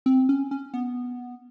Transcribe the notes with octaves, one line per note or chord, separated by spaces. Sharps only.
C4
C#4
C#4
B3